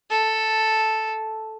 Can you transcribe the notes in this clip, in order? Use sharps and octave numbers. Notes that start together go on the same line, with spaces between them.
A4